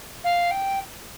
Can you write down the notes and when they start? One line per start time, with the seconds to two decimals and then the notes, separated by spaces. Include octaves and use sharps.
0.24 F5
0.51 G5